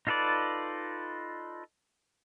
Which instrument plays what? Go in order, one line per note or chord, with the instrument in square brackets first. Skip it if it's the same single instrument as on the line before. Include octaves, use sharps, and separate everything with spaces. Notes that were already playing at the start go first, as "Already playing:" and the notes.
[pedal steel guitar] D#4 F4 A4 B4 D5